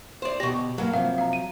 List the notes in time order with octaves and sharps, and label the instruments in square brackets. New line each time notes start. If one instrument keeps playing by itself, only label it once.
[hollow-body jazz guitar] C5 D5
[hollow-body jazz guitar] B2 G4 [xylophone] C#6 A#6
[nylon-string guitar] G2 A#3 F5 [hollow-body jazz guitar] F#3
[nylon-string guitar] C3 F3 [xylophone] F5
[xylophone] F5 A#5
D#7